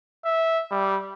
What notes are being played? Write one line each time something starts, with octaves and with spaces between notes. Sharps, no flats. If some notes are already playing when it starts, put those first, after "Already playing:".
E5
G3